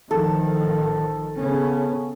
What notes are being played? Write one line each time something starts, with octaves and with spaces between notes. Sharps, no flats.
A1 D#3 F3 A4
C#3 B3 C#4